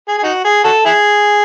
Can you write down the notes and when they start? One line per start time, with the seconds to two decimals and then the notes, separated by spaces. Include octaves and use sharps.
0.08 G#4
0.18 G#4
0.23 D#4 F#4
0.45 G#4
0.64 F#4 A4
0.86 E4 G#4